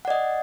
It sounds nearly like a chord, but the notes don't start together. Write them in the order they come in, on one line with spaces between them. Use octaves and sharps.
F#5 D5 D#5